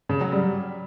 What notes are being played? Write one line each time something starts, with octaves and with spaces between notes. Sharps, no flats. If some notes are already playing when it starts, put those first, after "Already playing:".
C#3
F#3
G3